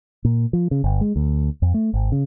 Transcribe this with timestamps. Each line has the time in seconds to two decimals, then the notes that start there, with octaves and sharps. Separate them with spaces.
0.25 A#2
0.53 F3
0.71 C#3
0.84 G1
1.01 G#3
1.16 D2
1.62 F2
1.74 A3
1.94 G#1
2.12 C#3